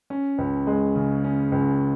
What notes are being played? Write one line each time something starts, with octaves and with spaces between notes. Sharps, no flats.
C#4
C#2
G#3
C#3
C#4
C#2